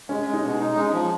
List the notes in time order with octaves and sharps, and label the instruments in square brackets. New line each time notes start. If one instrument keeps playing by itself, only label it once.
[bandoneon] G#3 [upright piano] C#4
[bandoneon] G#3
[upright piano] D#4
[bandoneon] B2 [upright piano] C#4
[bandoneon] D#4
[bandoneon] G#3 [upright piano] C#4
[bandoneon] F3